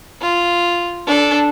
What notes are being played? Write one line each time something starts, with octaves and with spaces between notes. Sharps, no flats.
F4
D4 A4